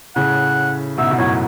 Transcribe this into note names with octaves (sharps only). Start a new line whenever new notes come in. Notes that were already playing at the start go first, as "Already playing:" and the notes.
A2 C#3 F#5
G#2 B2 E5
B2
F#2 A2 C#5